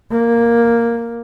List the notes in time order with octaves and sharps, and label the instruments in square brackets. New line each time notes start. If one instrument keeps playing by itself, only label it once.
[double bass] A#3